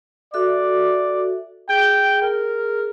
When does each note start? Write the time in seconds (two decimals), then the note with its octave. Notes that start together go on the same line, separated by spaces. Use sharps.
0.34 F#4 A4 D5 E5
1.69 G#4 G5
2.22 A#4